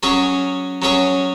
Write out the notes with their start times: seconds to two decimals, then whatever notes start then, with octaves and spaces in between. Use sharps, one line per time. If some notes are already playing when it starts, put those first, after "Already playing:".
0.03 F#3 C#4 G#4 C#5
0.82 F#3 C#4 G#4 C#5